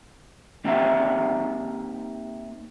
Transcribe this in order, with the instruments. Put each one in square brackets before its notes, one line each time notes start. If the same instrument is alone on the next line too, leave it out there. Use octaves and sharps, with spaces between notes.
[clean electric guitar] A#3 C4 D#4 G4 E5 F5